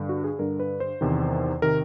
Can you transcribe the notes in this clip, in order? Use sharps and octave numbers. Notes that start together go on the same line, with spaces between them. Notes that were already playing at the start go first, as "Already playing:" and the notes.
Already playing: G2 D3
F#4
G#4
G2 D3 A#4
B4
C5
E2 C3 D#3
C3 D#3 A#4